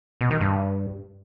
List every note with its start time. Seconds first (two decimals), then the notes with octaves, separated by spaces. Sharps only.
0.21 B2
0.31 D#3
0.41 G2